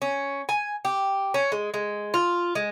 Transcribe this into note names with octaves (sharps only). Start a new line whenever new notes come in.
C#4
G#5
G4
C#4
G#3
G#3
F4
G#3